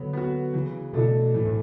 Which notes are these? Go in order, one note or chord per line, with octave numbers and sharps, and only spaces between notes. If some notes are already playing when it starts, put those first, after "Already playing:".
Already playing: D3 F#3 B3 F#4
B3 F#4
C#3 E3
B2 A3 D4 A4
A2 E3
A2